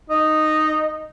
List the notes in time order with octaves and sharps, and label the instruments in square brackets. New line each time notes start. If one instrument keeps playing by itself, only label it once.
[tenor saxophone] D#4